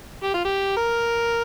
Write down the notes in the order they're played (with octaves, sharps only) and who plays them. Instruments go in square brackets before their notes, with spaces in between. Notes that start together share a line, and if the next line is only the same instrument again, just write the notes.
[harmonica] G4
F4
G4
A#4